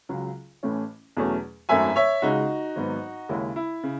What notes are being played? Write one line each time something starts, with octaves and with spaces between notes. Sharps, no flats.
C#2 C#3 F#3
A1 A2 E3 A3 C#4
E2 B2 F#3 A3 C#4
G#1 F#2 D#3 F#3 A3 E5 G#5
C#5 E5
C#2 C#3 G#3 D#4 F#4
G#1 G#2 F#3 B3
D#2 C#3 G#3 C#4 E4
E4
C#3